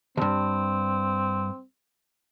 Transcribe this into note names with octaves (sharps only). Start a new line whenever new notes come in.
D2 G2 C4